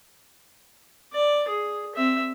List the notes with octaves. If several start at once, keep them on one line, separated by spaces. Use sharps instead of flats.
D5
G#4
C4 E5